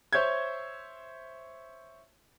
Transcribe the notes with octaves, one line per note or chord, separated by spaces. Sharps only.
C5 C#5 E5 G6 G#6